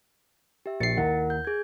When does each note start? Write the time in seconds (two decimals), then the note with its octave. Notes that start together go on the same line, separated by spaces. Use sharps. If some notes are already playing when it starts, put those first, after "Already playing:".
0.66 G4 E5
0.80 A#1 A6 C7 C#7
0.97 D#2 E4 A#4 F#5
1.30 G6
1.45 G#4 G#6